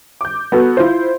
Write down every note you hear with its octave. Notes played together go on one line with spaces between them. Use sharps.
D6 G6
B3 F#4 A4
E4 F4 C5